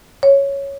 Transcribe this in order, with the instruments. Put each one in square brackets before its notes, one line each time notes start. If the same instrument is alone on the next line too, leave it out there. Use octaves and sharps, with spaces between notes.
[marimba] C#5